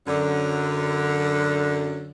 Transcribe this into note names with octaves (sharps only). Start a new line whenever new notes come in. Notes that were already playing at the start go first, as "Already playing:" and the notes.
F#2 D3